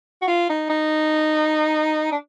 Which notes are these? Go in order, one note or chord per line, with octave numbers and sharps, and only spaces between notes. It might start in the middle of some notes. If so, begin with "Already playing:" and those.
F#4
F4
D#4
D#4
D4